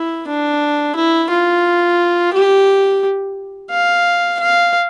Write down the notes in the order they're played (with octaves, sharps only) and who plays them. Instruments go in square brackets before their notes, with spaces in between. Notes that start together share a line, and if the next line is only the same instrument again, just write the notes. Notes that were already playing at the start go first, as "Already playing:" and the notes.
Already playing: [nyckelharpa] E4
D4
E4
F4
G4
F5
F5